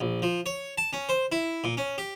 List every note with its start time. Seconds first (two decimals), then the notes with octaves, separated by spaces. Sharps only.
0.01 A#1
0.22 F3
0.46 C#5
0.78 A5
0.93 C#4
1.09 C5
1.32 E4
1.64 A#2
1.77 C#4
1.98 G4